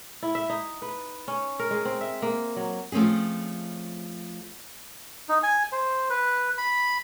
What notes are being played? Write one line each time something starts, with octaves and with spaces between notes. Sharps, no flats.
E4
E5
D#4
B4
C#4
A#4
G#3
C4
E5
A#3
F#3
F3 A3 C4 C#4 G#4
D#4
G#5
C5
B4
B5